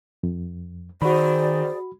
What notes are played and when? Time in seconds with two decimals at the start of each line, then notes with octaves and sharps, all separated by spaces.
0.23 F2
1.02 D#3 F#4 G#4 C5 D5 B5